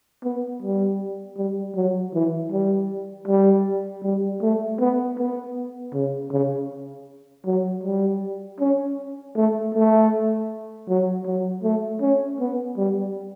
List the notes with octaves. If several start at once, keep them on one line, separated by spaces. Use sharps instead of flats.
B3
G3
G3
F#3
E3
G3
G3
G3
A3
B3
B3
C#3
C#3
F#3
G3
C#4
A3
A3
F#3
F#3
A3
C#4
B3
G3